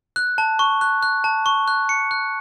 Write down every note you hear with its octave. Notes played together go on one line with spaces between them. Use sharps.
F#6
A5
C#6
F#6
F#6
A5
C#6
F#6
C#7
F#6